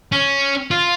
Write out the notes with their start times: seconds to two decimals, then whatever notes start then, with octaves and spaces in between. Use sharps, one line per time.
0.12 C#4
0.71 F4